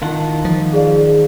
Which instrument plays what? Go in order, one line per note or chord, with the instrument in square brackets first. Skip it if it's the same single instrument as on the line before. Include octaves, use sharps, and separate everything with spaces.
[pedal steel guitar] D#3 F4 F#5 [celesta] E4 A5
[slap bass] F3
[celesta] G#4 D5 F5